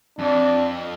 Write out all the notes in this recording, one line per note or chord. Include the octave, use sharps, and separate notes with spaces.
F2 D4